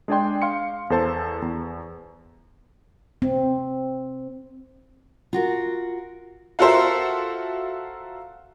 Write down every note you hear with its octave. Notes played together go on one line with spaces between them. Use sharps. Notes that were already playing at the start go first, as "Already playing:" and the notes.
G#3 D4 G#4 D5 G5 C6
F5 C6 C#7
E2 A4 C5 A5
E2
C4
F4 F#4 A#4
F4 F#4 A4 A#4 C5 E5